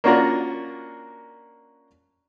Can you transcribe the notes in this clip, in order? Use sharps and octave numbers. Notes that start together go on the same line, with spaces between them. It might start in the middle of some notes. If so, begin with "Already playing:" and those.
A#3 C#4 D4 F4 F#4 A#4